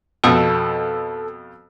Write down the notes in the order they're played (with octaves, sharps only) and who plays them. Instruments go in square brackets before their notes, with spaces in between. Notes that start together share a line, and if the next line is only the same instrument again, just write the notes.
[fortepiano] F2 B2 [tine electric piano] A4